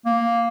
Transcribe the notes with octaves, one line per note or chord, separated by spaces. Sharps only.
A#3